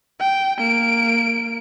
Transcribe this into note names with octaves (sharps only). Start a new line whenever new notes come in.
G5
A#3 D7